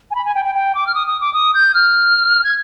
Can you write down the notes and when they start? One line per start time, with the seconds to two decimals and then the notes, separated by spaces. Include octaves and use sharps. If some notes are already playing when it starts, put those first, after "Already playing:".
0.11 G#5
0.15 B5
0.25 G#5
0.35 G5
0.45 G5
0.55 G5
0.75 D6
0.87 F6
0.95 D#6
1.07 D#6
1.21 D6
1.33 D#6
1.54 G6
1.74 F6
2.44 G#6